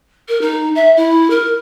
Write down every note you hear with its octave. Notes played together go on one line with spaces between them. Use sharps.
A#4
D#4
E5
E4
A#4